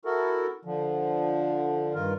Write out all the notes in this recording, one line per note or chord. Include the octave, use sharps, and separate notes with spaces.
E4 F#4 A4 A#4
D3 F3
G2 D#3 F4 A#4